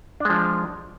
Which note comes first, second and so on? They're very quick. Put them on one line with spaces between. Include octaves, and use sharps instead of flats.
D4 G#3 F3